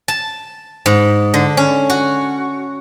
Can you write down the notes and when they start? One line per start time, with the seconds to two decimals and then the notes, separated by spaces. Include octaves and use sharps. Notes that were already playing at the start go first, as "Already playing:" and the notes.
0.08 A5
0.86 G#2
1.34 D3
1.57 C#4
1.90 F#4